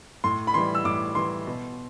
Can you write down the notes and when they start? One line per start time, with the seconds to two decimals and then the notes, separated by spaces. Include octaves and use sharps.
0.24 A2 C6
0.47 B5
0.54 E3 G3 C6
0.75 E6
0.85 A2 D6
1.15 E3 G3 C6
1.46 B2